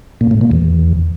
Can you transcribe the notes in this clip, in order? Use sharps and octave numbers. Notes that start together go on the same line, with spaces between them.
A#2
A2
A#2
E2